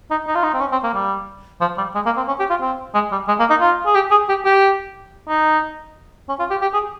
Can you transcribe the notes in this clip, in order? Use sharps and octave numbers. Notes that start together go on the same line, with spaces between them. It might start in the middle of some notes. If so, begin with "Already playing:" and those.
D#4
D#4
F4
D#4
C4
C#4
C4
A#3
G3
F3
G3
G#3
A#3
C4
C#4
G4
F4
C4
G#3
G3
G#3
A#3
D#4
F4
G#4
G4
G#4
G4
G4
D#4
C#4
F4
G4
G4
G#4